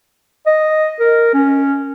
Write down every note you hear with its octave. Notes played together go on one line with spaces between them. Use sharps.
D#5
A#4
C#4